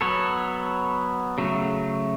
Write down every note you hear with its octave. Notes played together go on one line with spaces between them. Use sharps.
F#3 B3 A4 C#5
C#3 F#3 A3